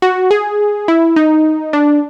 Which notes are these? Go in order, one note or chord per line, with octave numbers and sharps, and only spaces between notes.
F#4
G#4
E4
D#4
D4